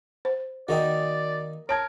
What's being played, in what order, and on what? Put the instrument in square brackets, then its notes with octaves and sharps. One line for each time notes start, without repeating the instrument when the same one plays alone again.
[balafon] C5
[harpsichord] D#3 A#3 D#4 [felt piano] F#4 D#5 G5 [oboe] D5
[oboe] A#4 [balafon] C#5 A5 [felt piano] G#6 D7